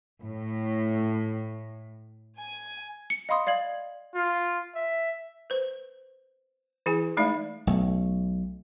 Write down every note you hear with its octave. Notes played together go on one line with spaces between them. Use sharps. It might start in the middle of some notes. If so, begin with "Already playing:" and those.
A2
G#5
C#7
D#5 F5 B5 C6 D#6
D5 F5 G#6 F#7
F4
E5
B4 C5
E3 E4 G#4 G#5
G#3 A3 D#4 D5 E5 F5
B1 A3